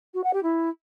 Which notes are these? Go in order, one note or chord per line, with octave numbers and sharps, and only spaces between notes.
F#4
F#5
G4
E4